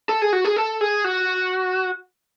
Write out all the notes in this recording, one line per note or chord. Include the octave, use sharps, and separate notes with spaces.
A4
G#4
F#4
G#4
A4
G#4
F#4